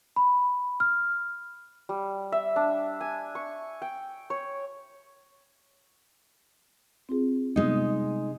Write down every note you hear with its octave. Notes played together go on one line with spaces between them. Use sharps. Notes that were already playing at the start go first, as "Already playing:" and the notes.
B5
F6
G3
E5
D4
G#5
C#6
G5
C#5
C4 F4 G#4
C3 G3 G#3 B3 D#4